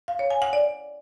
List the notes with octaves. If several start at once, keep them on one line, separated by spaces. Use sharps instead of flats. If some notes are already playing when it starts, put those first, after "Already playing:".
F5
C#5
G#5
F#5
D5